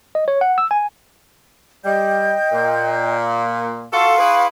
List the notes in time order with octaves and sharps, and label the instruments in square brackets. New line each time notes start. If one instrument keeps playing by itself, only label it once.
[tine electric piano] D#5
C#5
F#5
E6
G#5
[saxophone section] G3 [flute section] D#5 G5 G6
[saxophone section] A#2
[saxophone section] F4 F#4 A4 [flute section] F5 C6 C#6
[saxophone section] E4 G#4 B4